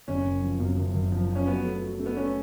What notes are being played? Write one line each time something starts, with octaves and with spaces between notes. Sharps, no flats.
F#1 C#4
F#1
F3
F#2
F#1
F#1
F3
F3
C#4
F#3 B3
A3
F#3
A3
B3
A3 C#4